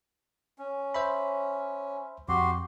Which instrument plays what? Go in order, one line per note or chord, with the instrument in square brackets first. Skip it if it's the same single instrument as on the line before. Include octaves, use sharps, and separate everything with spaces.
[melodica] C#4
[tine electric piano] C5 E5 B5
[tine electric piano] F2 [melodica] F#4 G4 C6